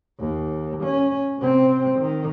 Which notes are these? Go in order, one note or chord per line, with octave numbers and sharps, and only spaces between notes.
D#2
C#4
C3 C4
D#3